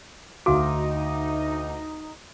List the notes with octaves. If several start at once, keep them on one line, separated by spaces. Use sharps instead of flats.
D2 D#4 F#4 F5 D6